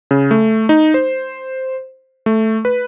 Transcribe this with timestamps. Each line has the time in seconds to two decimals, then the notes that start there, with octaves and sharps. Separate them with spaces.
0.11 C#3
0.31 A3
0.69 D#4
0.94 C5
2.26 A3
2.65 B4